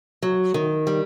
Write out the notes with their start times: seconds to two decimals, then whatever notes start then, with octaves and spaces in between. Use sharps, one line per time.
0.22 F#3
0.54 D#3
0.87 G3